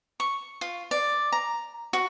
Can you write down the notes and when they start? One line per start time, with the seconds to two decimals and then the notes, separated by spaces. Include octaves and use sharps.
0.20 C#6
0.61 F4
0.91 D5
1.32 A#5
1.93 F#4